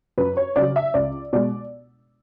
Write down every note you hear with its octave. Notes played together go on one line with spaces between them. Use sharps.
F#2 B4
C#5
C#3 F#3 D5
E5
C#2 D5
B2 G#3 D5